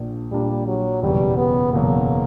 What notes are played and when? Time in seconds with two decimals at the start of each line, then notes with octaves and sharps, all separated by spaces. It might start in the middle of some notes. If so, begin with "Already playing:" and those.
Already playing: A#1 A#2 A#3 D4
0.31 A#1 A#2 G3 A#3 D4
0.66 F#3
1.02 F#1 E2 B2 F#3 G3
1.37 B3
1.73 F#1 E2 B2 F#3 A#3